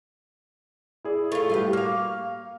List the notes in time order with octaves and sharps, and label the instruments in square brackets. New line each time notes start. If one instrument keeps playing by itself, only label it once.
[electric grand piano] E4 G#4 D5
[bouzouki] A3 F4 [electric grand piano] A4
[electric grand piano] A2 G3 F#4 [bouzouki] G4 B4 F5
[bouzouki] A#3 F5 [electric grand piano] C#6 F6